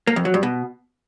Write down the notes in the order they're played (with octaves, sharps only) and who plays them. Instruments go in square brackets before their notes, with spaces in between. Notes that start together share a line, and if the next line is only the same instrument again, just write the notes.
[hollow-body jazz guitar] A#3
F2
F#3
G2
B2